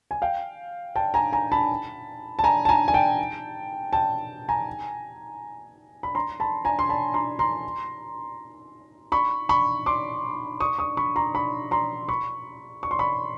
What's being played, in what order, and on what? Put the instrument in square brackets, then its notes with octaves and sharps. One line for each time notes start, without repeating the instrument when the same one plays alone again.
[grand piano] G#5
F5 G5
G5 A5
G#5 A#5
G#5 A#5
A5 B5
A5
G#5 A#5
A5
G#5 A#5
G#5
G5 A5
G5 A5
G#5 A#5
B5
A#5 C6
A5 B5
G#5 A#5
C6
A5 B5
A#5 C6
A#5 C6
B5 C#6
B5 C#6
C6 D6
C#6 D#6
C#6 D#6
B5 C#6
A#5 C6
B5 C#6
A#5 C6
B5 C#6
C#6
C6
B5 C#6